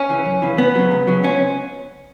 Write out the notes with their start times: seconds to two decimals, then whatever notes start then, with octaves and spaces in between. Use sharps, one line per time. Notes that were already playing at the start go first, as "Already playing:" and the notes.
Already playing: C#4
0.09 C#3 E3
0.26 F#2
0.42 C#3 E3
0.58 C#2 B3
0.75 C#3 F#3
0.91 C#2
1.07 C#3 F#3
1.24 C#2 C#4